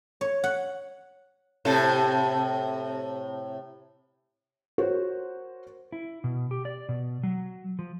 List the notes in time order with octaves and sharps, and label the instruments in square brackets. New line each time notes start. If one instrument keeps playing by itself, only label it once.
[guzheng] C#5
F#5
[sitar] A2 C3 A4
[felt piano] F#4 A#4 C5 C#5
[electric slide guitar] E4
B2
G4
D5
B2
F#3
F3